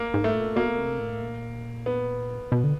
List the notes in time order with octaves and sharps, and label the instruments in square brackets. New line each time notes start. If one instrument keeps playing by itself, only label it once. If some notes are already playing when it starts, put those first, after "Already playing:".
Already playing: [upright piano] A#3
[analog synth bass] G#2
[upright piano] A3
[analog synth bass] A#2
[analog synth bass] B2 [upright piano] A#3
[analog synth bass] C3
A2
A#2
[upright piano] B3
[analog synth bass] B2
D3